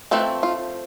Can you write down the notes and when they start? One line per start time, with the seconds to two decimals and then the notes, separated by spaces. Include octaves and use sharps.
0.11 F3 A3 C4 B4
0.43 F4